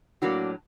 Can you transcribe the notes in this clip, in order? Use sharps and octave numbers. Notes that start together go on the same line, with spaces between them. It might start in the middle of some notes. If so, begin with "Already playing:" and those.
A2 F#3 A#3 D4 F#4